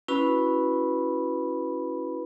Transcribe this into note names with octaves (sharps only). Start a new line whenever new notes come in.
C#4 E4 F#4 B4 B5